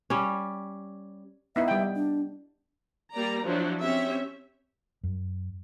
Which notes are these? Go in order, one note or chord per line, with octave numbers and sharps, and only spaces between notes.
G3 C#4
B3 D#4 E4 E5
G3 G5
D4
G3 A#3 D5 A#5
F3 F#3 D4 E4
C4 C#4 G4 C#5 E5
F#2